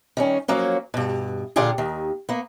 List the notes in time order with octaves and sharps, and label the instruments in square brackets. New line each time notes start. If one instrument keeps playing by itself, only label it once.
[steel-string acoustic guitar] D#3 G3 C#4
F3 F#3 A#3 C#4
G2 B2
A#2 D3 D4 F4 G4 G#4
D#2 D#3
A#3 B3